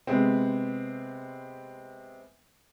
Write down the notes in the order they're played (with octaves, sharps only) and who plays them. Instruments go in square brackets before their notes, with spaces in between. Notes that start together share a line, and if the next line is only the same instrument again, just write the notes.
[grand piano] C3 G#3 B3 C4